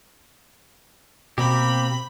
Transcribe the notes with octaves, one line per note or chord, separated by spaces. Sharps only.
B2 A#3 C4 G4 B5